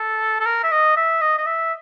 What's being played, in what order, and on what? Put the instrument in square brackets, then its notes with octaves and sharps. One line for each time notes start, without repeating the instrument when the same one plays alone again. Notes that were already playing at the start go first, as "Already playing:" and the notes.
Already playing: [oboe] A4
A4
A#4
E5
D#5
E5
D#5
D#5
E5